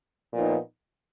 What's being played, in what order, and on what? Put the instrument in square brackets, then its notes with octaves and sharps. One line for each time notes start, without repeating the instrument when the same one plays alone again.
[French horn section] A#2 F3 B3 D#4